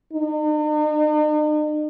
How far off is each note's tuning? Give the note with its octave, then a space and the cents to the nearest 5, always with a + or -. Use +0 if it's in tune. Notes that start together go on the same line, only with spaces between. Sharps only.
D#4 -45